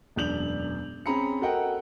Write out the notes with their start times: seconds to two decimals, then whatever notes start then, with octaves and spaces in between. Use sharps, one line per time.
0.16 E1 F#2 D4 G6 F7 F#7
1.06 C4 C#4 G#4 A#5 B5 C#7
1.41 F#4 A4 A#4 D#5 F#5 G5